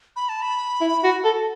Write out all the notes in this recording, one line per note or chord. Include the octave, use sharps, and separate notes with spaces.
B5
A5
B5
E4
F#4
A4